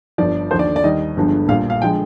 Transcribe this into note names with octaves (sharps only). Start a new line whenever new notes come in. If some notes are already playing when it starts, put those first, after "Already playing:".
G1 G2 F3 D5
D#2 D3 F3 C5
D5
D5
D#2 D#3 G3 D#5
G1 G2 D3 F3 G#3
A#1 A#2 G3 F5
F5
D3 F3 G#3 G5